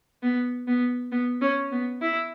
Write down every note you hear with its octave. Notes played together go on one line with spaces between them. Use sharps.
B3
B3
B3
C#4
B3
E4